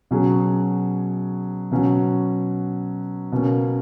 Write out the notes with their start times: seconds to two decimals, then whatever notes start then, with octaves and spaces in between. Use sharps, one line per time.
0.11 B2 F#3 C#4 G#4
1.72 B2 F#3 C#4 F#4
3.32 B2 A#3 C#4